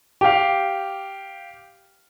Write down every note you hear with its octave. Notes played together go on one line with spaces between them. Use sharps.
G4 F5